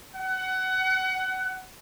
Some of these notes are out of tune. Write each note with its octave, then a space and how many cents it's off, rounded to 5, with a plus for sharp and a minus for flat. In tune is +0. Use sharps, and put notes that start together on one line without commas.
F#5 +20